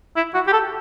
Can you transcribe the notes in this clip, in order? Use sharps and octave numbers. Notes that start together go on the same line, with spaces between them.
E4
F#4
G4
A4